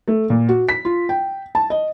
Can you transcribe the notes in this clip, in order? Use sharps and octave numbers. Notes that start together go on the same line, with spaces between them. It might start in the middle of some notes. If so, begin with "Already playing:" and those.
A3
A#2
F#4
B6
F4
G5
A5
D#5